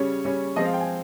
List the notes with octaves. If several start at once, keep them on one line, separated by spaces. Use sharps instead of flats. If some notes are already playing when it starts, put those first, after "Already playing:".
Already playing: C#3 G3 C#4 C#5
C#3 G3 C#4
F3 G#3 C4 D#5
F5
G5
G#5